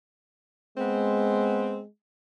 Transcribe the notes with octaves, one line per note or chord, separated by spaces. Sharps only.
G#3 B3 C4